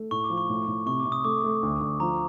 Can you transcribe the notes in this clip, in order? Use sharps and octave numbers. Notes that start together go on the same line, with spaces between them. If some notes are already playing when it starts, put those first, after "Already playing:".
Already playing: A3
A2 C#6
D6
F3
C#6
A2
A2
C3 C#6
D6
C3
D#6
A3 D6
A3
D2
D2
F3 A#5